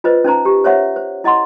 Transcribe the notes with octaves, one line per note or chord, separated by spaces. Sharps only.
F4 B4 C5 D#5
C#4 D#4 C5 A#5
G4
C5 C#5 E5 F#5
C5
E4 D#5 F#5 C6